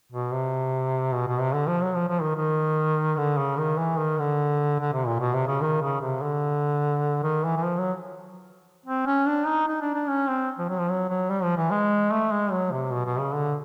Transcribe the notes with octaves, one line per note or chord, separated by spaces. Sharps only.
B2
C3
B2
B2
C3
D3
F3
F#3
F3
F3
D#3
D#3
D3
C#3
D#3
E3
D#3
D3
D3
C3
A#2
B2
C3
C#3
D#3
C#3
C3
D3
D#3
E3
E3
F3
F#3
C4
C#4
D4
D#4
D#4
D4
D4
C#4
C4
F3
F#3
F3
F#3
F#3
G3
F3
E3
G#3
A3
G#3
F#3
C3
B2
B2
C#3
D3